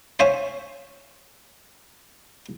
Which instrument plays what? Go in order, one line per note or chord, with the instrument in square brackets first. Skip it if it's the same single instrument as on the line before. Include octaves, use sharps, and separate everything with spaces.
[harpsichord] C5 C#5 E5 F5 G#5